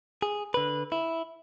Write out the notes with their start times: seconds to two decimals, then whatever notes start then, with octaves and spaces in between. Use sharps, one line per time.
0.22 G#4
0.54 D3 B4
0.92 E4